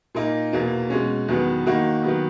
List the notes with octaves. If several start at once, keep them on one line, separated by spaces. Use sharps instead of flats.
A#2 A#3 D#4
E2 B2 A#3
B2 G#3 C#4
E2 D#3 F#3 B3
D#3 A#3 D#4 F#4
D#3 F#3 B3